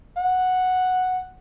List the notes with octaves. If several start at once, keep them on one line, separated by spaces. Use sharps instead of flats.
F#5